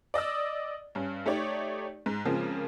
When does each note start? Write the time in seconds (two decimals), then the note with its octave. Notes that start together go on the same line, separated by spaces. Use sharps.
0.14 D5 D#5 D#6 E6
0.95 G2 C#4
1.26 A3 D#4 G4 C#5 D5
2.06 G#2
2.25 C#3 F3 G#3 A#3 C4